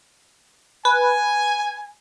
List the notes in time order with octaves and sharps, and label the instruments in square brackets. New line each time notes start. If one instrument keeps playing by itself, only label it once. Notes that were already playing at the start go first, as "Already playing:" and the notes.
[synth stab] B4 [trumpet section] G#5